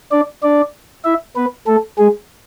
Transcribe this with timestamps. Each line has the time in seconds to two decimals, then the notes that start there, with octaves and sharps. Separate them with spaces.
0.11 D4 D5
0.43 D4 D5
1.05 E4 E5
1.36 B3 B4
1.67 A3 A4
1.98 G#3 G#4